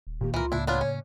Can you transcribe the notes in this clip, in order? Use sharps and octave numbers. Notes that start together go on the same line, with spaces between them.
D#1
A#2 D#3 A#3 G4
C#2 E3 F4 A#4
A2 C#3 A#3 D4 E4
B3 D4 F4 C#5
C#4